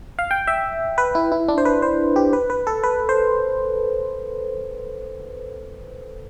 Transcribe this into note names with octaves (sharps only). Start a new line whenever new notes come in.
F5
G5
E5
B4
E4
E4
D4
C5
B4
C5
G4
B4
B4
A4
B4
C5